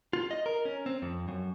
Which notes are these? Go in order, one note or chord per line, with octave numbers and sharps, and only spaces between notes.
F4
D#5
A#4
C#4
C4
F2
F#2